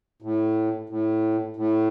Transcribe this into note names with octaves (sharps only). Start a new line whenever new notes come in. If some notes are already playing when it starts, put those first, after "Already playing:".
A2
A2
A2